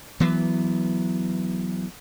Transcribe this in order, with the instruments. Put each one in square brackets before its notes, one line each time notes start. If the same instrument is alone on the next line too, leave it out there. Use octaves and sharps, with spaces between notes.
[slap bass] E3 F#3 B3